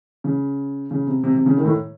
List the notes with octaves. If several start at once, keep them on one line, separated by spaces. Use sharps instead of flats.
C#3
C#3
C3
C3
C3
C#3
D#3
A2